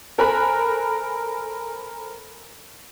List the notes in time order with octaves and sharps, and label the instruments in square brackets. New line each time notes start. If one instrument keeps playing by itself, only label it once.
[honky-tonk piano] A4 A#4 C5 G#5 B5 F#6